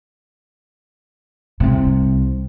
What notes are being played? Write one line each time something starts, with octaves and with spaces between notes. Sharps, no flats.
C2 C3